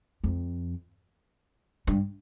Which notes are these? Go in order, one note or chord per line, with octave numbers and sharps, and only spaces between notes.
F2
G2